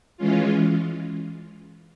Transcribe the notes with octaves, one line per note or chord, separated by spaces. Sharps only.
E3 G#3 C#4 F4